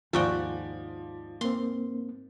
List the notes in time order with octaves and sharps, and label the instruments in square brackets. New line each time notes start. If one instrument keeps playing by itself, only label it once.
[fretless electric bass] D#2 [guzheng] G#2 F#4 G5 [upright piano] F3 D5 [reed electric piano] F4
[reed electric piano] A#3 C4 [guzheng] C6